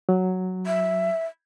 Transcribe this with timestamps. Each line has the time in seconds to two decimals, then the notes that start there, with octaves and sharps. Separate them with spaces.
0.09 F#3
0.67 E5